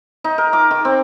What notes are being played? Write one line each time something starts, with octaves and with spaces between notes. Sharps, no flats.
D#4
A#4
D6
D#3
C4